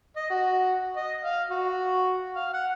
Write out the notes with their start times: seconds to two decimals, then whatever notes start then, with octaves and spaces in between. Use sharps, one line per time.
0.16 D#5
0.30 F#4
0.96 D#5
1.24 F5
1.51 F#4
2.35 F5
2.53 F#5